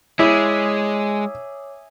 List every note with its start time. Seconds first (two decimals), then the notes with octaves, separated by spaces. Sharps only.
0.19 G#3 E4 G#4 C#5 E5 D6 D#6